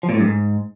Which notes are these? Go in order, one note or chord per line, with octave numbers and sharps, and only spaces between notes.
F3
A#2
A2
G2
G#2